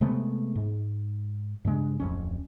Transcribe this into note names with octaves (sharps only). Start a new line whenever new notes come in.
C3 G#3 A3 B3
G#2
G2 C#3 G#3 D4
D1 F2 C#4